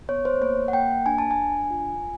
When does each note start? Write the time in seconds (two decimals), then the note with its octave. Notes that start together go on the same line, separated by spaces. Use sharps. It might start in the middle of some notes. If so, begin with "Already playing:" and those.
0.09 B3 C#5
0.25 C5
0.41 A#3 C#5
0.68 F#5
0.73 A#3 G5
1.06 D4 G#5
1.18 A5
1.31 G#5
1.38 D4
1.70 F4